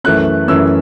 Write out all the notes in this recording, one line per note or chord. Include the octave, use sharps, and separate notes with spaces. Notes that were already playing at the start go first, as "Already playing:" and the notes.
F#2 E3 A3 C#4 F#6
F#2 E3 A3 C#4 E6